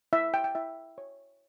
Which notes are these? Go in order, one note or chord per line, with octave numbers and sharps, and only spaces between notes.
E4 E5
G5
G5
E4 E5
C#5